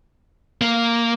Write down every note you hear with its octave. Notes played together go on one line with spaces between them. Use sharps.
A#3